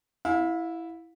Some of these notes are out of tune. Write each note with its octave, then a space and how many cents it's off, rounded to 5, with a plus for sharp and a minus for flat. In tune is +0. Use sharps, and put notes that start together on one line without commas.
E4 +0 F5 +35